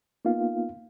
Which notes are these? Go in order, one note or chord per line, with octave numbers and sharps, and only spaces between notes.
A#3 B3 D#4 F4 F5